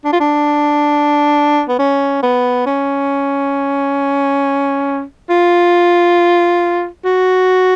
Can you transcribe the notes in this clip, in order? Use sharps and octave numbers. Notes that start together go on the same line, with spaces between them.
D4
F4
D4
B3
C#4
B3
C#4
F4
F#4